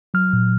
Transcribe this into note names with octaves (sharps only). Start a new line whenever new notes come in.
F#3 F6
A#2